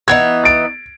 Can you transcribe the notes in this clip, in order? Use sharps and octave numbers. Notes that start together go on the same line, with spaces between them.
E3 B3 D#4 G#6
A6 D7